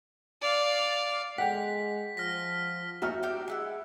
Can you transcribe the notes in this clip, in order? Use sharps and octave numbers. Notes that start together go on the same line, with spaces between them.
D5 F5
G#3 F#5 G5 B6
F3 F6 A#6 B6
D#4 F4 F#4 E5 F6
C4 D4 G4
G#3 E4 F#5